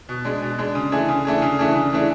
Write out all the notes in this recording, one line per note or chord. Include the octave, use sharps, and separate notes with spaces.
B2
G#3 D4
B2
G#3 D4
C#3
E3 A3 D4 G#4
C#3
E3 A3 D4 G#4
C#3
E3 A3 D4 G#4
C#3
E3 A3 D4 G#4